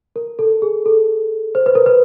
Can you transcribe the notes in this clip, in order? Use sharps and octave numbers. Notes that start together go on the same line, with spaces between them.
A#4
A4
G#4
A4
C5
B4
A#4
B4